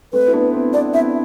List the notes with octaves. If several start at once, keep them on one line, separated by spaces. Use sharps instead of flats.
A3 C4 B4
E4
B3 D4
C4 E4
B3 D4 D5
C4 E4 E5